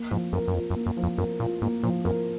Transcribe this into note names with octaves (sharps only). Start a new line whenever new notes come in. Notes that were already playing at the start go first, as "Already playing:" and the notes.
Already playing: A#3
G#2 F3
F#2 A#4
F#2
F2 F4
F#2
A#3
F#2
F3
F2
F#2 A#4
A#2 F4
G#2 A#3
A#2 F3
F#2 A#4